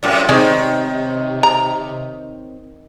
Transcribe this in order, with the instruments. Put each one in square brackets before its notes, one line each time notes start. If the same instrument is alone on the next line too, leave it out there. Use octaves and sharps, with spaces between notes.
[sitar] F#2 A2 C3 [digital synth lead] D5
[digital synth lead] C3 [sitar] D#3 [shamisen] G#3 G#4 D5 [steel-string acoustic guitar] C4 D#4 C#5
[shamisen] A#5